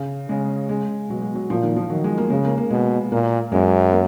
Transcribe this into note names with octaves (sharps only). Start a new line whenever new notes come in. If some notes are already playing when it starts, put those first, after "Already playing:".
Already playing: C#3
C#3 G#3
G#3
B2 F#3
G#3
F#3
A#2 F3
D#3
F3
D#3 F#3
G#3
A#3
C#3 G#3
A#3
A#3
B2 G#3
A#2 A#3
F#2 G#3
A#3